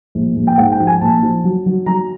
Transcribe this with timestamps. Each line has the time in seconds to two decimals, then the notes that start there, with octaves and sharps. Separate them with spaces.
0.15 A#1
0.36 A#1
0.47 G5
0.58 G#2 F#5
0.72 G5
0.80 F3
0.87 G#5
1.01 A#1 A5
1.23 F3
1.44 F#3
1.66 F#3
1.86 F#3 A#5